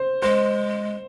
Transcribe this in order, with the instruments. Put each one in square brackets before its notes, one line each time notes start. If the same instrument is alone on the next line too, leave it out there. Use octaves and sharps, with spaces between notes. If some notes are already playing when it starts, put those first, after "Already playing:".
Already playing: [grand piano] C5
[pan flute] G#3 [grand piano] C5